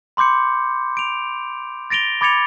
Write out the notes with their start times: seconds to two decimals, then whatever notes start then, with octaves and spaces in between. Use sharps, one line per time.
0.17 B5 C6 D6 G6 C#7
0.97 D7 F7
1.90 A6 A#6 D7 F7 G7
2.21 B5 D6 G#6 A6 C#7 F7